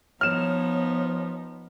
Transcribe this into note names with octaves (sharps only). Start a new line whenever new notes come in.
F3 B3 D#4 C#5 F6 E7